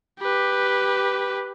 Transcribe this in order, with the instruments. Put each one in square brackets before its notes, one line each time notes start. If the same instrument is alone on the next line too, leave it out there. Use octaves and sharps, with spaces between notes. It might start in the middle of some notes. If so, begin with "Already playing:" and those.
[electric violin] G4 B4